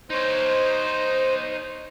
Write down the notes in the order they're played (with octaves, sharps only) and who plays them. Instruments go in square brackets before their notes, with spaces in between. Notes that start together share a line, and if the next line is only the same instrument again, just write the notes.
[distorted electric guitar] D#4 C#5 [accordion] C5